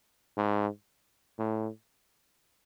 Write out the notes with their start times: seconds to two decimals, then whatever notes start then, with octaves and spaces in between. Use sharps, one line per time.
0.37 G#2
1.38 A2